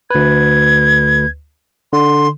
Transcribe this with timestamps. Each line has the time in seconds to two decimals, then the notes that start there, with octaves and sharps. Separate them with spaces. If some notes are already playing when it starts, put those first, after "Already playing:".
0.10 D2 B4 G#6
1.93 D3 C6